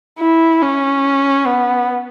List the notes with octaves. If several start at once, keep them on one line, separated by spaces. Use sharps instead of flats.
E4
C#4
B3